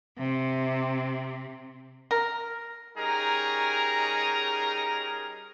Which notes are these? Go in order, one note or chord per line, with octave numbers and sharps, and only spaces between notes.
C3
A#4
G3 C#4 D#4 G#4 A#4 A#5